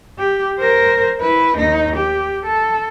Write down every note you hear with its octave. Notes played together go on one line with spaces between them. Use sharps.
G4
A#4 C5
E4 B4
D#2 D#4
G4
A4